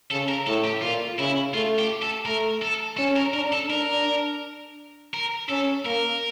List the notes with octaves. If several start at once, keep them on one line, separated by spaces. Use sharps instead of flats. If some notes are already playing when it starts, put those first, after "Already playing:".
C#3 A4
A#4
A2 A4
G4
A#2 F4
C#3 E4
A3 F4
G4
A4
A3 A#4
A4
C#4 A4
A#4
D4 A#4
A4
D4 A#4
A#4
C#4 A4
A#3 A#4